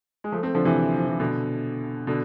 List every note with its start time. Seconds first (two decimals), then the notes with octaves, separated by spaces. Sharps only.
0.24 G#3
0.32 F3 A3
0.43 A3 C4
0.55 D3 F3
0.65 C3 E3
0.97 F3
1.09 E3
1.20 B2 D3
2.07 B2 D3